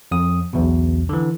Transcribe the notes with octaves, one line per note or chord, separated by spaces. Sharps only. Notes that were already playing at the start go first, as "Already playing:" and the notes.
F2 D#6
B1 E2 B2
D3 E3